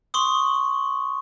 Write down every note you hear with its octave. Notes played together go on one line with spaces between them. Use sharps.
C6 C#6 D#6